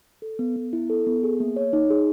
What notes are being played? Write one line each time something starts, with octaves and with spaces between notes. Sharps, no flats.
A4
B3
B3
E4
A4
B3
G#4
A#3
C#5
D#4
G#4